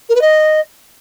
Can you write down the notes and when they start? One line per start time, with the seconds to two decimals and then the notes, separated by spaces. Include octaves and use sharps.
0.09 A#4
0.15 B4
0.21 D#5